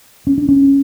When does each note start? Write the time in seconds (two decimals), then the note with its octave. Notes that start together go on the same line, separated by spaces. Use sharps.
0.27 C#4
0.38 D4
0.49 C#4